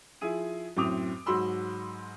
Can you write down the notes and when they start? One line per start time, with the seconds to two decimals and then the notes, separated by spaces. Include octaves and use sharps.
0.21 F3 E4 G#4 D#7
0.77 F#2 A2 C4 D6 D#6 F7
1.26 G#2 F#3 F#4 B5 C6 E6